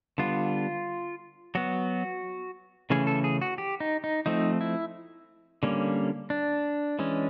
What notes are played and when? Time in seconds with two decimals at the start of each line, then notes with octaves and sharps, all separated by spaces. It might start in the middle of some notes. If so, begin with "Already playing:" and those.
0.18 D3 G3 B3 F4
1.55 F#3 B3 F#4
2.90 C#3 E3 A3 C#4 G#4
3.07 A4
3.24 G#4
3.41 F#4
3.58 G4
3.80 D#4
4.04 D#4
4.26 F3 A3 C4 D#4
4.61 E4
5.63 D3 G3 A#3 C#4
6.30 D4
6.99 E3 G#3 C#4